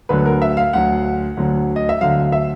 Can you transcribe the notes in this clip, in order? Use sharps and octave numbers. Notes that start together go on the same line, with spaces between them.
D2 D3 F#3 B4
A#4
E5
F5
D2 D3 F#3 F#5
D2 D3 F#3
D#5
E5
D2 D3 F#3 F5
F5
E5